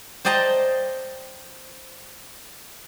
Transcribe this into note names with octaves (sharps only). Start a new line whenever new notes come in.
C5 D5 D#5 G5 A5 A#5